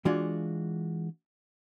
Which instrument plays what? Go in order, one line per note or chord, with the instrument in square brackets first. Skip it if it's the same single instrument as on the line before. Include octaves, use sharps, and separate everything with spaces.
[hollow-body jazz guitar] E3 G#3 D4 F4 F#4